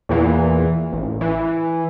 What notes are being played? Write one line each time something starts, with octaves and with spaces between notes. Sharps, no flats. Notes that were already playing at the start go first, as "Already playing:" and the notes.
E2 A#2 E3
A1
E3